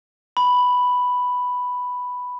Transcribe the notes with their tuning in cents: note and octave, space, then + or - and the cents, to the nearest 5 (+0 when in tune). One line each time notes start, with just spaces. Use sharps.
B5 +0